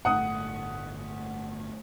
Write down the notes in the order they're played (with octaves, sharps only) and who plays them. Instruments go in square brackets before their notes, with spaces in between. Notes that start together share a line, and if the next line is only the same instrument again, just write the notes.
[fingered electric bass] G1 A2 A3 [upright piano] F#5 D#6